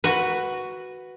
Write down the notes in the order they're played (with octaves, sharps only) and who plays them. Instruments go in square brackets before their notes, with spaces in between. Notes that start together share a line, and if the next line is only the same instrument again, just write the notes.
[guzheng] F#4 B4